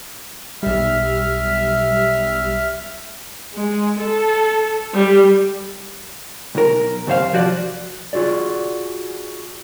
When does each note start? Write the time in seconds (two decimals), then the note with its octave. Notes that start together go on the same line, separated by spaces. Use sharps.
0.63 B1 G3 E5 F6
3.54 G#3
3.99 A4
4.94 G3
6.55 B1 A#4
7.07 C2 F#2 C5 F5
7.33 F3 F#4 D5
8.13 F4 F#4 G#4 D5